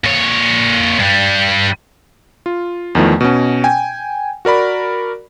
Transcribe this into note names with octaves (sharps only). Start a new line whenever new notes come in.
A#2 C#5
G2 G3
F4
E2 D#3 F3 A3
B2 C#4
G5 G#5
F#4 A#4 D5 B5